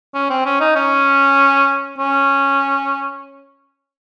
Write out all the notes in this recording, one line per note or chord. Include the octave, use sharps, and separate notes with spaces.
C#4
C4
C#4
D#4
C#4
C#4